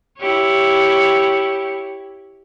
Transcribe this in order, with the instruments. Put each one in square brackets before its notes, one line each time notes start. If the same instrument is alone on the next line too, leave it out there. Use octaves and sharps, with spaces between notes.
[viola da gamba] E4 G4 C#5